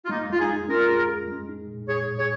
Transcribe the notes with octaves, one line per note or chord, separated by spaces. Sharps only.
F4
G#3 A#3 D#4
G#3 F4
D#4 G#4
G#3
C#4 F4 A#4
G#4
G#4
G#3
D#4
A#2
A#2 G#4 C#5
A#2
G#4 C#5